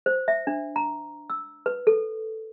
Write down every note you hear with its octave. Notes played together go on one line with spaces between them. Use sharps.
C5
E5
D4
A#5
E6
B4
A4